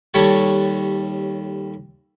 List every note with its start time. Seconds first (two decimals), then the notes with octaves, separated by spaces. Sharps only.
0.14 D#2 G3 A4 C#5 F#5